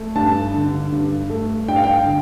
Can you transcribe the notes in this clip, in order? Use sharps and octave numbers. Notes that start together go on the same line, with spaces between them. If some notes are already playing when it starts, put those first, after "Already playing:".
Already playing: A3
G2 A5
D3
G2
A3
G2 G5
F5
G5
D3